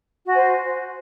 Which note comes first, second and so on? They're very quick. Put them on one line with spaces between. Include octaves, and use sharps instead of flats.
F#4 G#5 C5